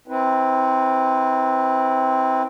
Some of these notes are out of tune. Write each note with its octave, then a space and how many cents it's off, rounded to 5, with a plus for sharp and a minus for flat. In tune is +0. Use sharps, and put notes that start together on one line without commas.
C4 +0 E4 -35 B4 +0